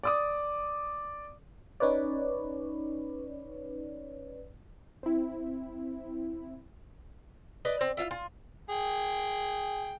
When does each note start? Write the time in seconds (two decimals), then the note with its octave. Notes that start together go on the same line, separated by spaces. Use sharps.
0.03 D5 D6 D#6
1.80 C#4 D#4 B4 C#5 D5
5.03 C4 E4
7.65 B4 D5 D#5
7.81 C4
7.97 E4 F4 E5 F5
8.11 F4
8.70 G#4 G5